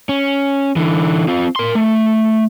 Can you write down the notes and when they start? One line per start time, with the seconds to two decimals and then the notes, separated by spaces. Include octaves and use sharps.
0.09 C#4
0.76 D3 E3
1.28 C4 F4
1.56 A#4 C6
1.75 A3